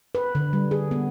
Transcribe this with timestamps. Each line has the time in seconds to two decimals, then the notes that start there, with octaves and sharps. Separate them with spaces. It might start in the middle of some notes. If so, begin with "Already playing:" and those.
0.15 B4
0.35 D3
0.53 G3
0.71 G#4
0.91 B3